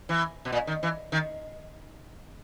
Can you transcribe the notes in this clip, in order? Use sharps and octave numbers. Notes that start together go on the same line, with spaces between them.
E3
B2
A#2
D#3
E3
D#3